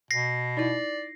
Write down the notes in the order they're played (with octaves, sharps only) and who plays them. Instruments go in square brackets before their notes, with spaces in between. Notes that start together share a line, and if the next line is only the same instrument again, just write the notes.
[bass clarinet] B2 [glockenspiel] A#6 C7
[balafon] D#4 E4 [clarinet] D5